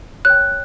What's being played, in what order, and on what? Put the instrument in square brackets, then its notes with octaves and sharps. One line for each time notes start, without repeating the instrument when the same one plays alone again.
[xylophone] C#5 G5 F#6